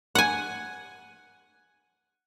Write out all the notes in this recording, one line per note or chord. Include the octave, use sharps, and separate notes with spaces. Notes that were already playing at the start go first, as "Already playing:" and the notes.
F#5 G#5